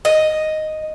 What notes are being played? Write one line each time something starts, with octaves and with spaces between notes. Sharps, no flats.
D#5